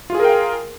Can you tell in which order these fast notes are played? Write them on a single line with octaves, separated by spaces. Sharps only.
F4 G#4 A#4 G5 F5